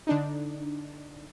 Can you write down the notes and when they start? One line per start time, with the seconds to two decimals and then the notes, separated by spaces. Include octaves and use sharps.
0.07 D3 D4 D#4